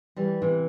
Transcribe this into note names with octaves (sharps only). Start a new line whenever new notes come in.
E3 G3
C3 E3